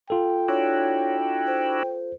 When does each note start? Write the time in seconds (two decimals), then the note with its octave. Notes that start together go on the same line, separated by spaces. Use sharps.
0.10 F4 A4 G5
0.48 D4 E4 F#4 C#5
1.47 C5